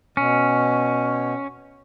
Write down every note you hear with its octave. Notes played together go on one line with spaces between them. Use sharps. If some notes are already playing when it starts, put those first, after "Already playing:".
B2 C#4